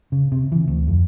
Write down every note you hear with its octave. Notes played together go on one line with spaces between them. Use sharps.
C#3
C3
E3
D2
F2